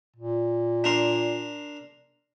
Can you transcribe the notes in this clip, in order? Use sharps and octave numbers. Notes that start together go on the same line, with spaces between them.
A#2
D4 A#4 C6